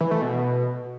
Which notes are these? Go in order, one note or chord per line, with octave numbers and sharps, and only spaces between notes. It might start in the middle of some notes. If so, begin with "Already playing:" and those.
E3
A3
B2